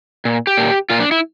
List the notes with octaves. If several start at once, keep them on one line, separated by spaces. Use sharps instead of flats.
A#2
G4
A#2
A#2 F4
D4
E4